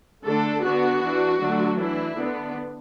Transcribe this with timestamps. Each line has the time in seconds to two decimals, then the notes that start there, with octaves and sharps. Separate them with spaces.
0.24 D3 A3 D4 A4
0.63 D3 B3 D4 F#4
1.02 E3 D4
1.40 D3 F#3 A3 D4
1.79 E3 D4 E4
2.17 D3 B3 D4